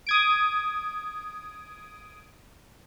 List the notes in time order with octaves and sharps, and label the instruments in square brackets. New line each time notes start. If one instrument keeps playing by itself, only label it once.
[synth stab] D#6 G#6 D7